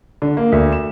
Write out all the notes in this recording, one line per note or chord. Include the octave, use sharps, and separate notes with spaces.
D3
A#3
D2
E7